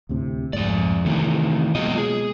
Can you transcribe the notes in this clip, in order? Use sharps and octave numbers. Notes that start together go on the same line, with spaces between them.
D2 A2 C3
C2 F2 G#2 A3 D5
C3 D#3 E3 A3
B2 F#3 G#3 A#3 F4 D#5
G#4